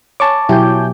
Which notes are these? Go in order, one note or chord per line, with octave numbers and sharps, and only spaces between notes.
C#5 G#5 A5 C#6 D6
B2 F#3 E4 G4 G#5 G6